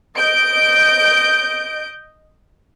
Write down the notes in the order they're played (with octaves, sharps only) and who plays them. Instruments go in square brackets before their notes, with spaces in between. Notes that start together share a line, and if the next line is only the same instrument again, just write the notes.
[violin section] D#5 G6 D7